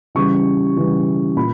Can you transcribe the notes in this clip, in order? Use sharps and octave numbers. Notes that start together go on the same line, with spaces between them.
C#3 E3 G3 C#6
C#3 E3 G3
A#2 B5